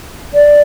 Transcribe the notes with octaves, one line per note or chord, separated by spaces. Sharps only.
D5